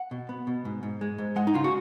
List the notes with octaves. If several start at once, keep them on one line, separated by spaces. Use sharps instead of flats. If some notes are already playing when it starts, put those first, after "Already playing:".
Already playing: F#5
B2
B3
B2
G#2
G#2
G#3
G#2
G#3 F#5
D#4
C#3 F4
F#4